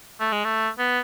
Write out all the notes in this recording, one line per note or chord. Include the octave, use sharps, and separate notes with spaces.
A3
G#3
A3
B3